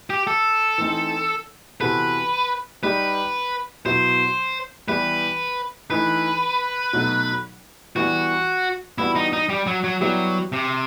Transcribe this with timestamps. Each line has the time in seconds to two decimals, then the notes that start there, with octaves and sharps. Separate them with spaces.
0.10 G4
0.27 A4
0.78 E3 A3 C4 D#4
1.81 C3 E3 B3 F#4 A4 B4
2.83 G3 D#4 G4 B4
3.86 B2 F#3 B3 E4 C5
4.88 E3 G3 B3 E4 G4 B4
5.90 E3 A3 D#4 B4
6.93 B2 F#3 A3 D#4
7.96 E3 G3 B3 F#4
8.98 E3 G3 B3 E4 F#4
9.15 D#4
9.33 D#4
9.49 G3
9.67 F#3
9.84 F#3
10.01 F#3 G3 B3 E4 G4
10.52 C3